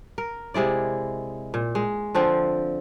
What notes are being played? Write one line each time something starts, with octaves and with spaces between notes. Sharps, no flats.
A#4
C3 G#3 E4 D5
A#2
G#3
D3 F3 C4